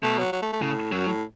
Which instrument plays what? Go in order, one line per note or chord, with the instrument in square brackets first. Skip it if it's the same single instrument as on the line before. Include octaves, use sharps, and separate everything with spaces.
[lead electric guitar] B2 [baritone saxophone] A3
[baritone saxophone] F#3
F#3
A3
A3
[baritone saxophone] A2 [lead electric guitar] C#3
[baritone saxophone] F#2 [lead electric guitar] F#3
[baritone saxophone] A2